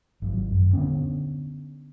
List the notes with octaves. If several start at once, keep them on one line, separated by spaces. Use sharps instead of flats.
G#1 F#3
F#2
D3 E3 B3 C#4